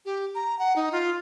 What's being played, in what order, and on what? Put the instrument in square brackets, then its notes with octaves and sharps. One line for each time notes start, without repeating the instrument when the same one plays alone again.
[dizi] G4
A#5
F#5
D#4
F4